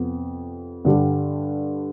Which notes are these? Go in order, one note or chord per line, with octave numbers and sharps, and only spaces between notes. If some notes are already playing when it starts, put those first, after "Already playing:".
Already playing: F2 C3 B3
G2 D3 G3